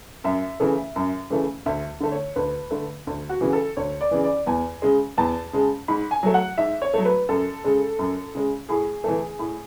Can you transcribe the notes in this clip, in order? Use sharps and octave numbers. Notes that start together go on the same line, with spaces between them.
F#2 E5
C#3 E3 A3
F#2
C#3 E3 A3
D2 E5
D3 A3
C#5
D2 B4
D3 A3
D2
F#4
C#3 E3
A4
D2 C#5
D5
C#3 E3
D5
E2 G#5
C#3 G#3
E2 A5
C#3 G#3
G#2 B5
G#5
F#3 A3
F#5
G#2 E5
C#5
F#3 A3
B4
F#2 A4
C#3 G#3
F#2
C#3 G#3
A2 G#4
E3 A3
A2